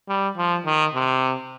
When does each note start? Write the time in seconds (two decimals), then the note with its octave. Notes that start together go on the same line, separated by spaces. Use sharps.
0.08 G3
0.37 F3
0.65 D#3
0.94 C3